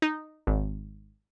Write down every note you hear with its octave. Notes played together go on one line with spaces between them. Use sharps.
D#4
G#1